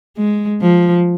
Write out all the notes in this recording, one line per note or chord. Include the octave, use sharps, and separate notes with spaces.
G#3
F3